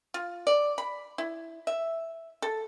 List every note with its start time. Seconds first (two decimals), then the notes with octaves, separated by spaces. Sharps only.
0.14 F4
0.47 D5
0.78 B5
1.18 E4
1.67 E5
2.42 A4